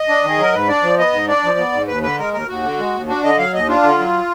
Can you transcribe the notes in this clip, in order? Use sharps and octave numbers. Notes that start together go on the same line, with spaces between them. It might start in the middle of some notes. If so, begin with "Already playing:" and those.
Already playing: D#5
D4
D#3 G#4
F#3 A#4
G#2 B4
D4 D5
F3
B3 D#5
G#2
D4 D5
F3
B3
G#2
D#2 B4
D3 B4
G#3 A#4
D#2 A#4
D#2 F#4
D3
G#3
D#2
D4 F#4
D3 D#5
F#3 F5
D#2 D#5
D4 F4
D3
F#3